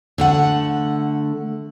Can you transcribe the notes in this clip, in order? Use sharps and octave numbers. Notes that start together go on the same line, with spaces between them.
D3 A3 F#5